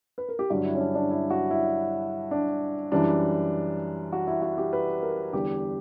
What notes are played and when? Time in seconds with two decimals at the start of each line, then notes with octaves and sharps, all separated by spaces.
0.18 B4
0.29 A#4
0.39 G4
0.50 G2 D3 F#3 F#4
0.65 E4
0.75 C#4
0.80 D4
0.95 D4
1.11 E4
1.30 F#4
1.51 E4
2.31 D4
2.92 F#2 E3 G3 D4
4.12 F#4
4.27 E4
4.42 F#4
4.58 G4
4.73 B4
5.02 A#4
5.33 E2 D3 G3 G4